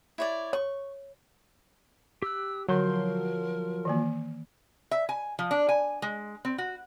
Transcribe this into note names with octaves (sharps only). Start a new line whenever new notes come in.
E4 C#5 D5
C#5 C#6
G4 E6 F#6
D3 F3 F#3 A#4 C6 G6
D#3 E3 A#3
E5
G#5
F3
D4
G#5
G#3
C4
F#4